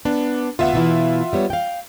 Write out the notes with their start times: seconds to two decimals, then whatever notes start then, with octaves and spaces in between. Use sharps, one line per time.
0.05 B3 D4
0.59 D2 B3 F4 E5 F#5
0.73 B2 E3 E4
1.33 G3 B3 C#5
1.50 F5 G5